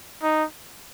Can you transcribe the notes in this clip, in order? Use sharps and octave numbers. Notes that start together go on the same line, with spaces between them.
D#4